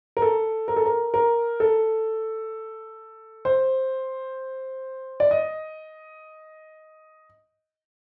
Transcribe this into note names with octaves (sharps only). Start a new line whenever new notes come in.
A#4
A4
A#4
A4
A#4
A#4
A4
C5
D5
D#5